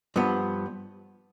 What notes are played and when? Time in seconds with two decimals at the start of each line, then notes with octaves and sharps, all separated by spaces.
0.16 G2 F3 B3